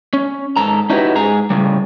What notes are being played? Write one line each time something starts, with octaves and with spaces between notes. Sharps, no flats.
C#4
G#2 A4 A#5
C#4 D#4 E4 F#4 G4 B4
G#2 G#4 A#5
A2 C#3 G3